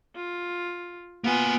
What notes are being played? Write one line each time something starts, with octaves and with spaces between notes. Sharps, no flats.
F4
A#3 B3 F4 G#5